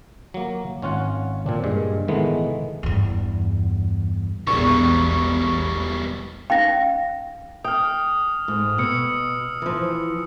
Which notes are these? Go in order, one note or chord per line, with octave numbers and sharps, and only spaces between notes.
F#3 A#3
G#1 C#4 F4 C#5 F#5
A#2 C4 D4
G2 A#2 G#3
A2 D#3 E3 G#3 A3 B3
E2 G2
E1 A#1 E2 B2 G3 C#6
C#4 D#4 F5 G5 A#6
G5 D#6 F6
G#2
B2 E6 C#7
E3 F3